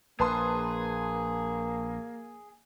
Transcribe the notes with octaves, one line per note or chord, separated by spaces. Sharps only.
A#1 A#3 G#4 B4 A5 C6